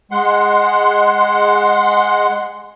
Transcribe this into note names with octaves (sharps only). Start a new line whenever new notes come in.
G#3 F#5 C6